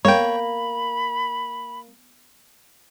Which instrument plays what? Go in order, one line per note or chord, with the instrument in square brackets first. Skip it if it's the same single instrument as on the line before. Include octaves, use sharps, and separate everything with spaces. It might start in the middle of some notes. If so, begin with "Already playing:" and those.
[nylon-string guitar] A#3 [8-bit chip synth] C#5 G5 [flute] B5